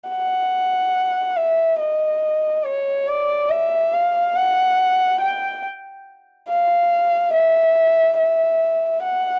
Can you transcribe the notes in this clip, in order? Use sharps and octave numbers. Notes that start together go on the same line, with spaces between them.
F#5
E5
D#5
C#5
D5
E5
F5
F#5
G5
F5
E5
E5
F#5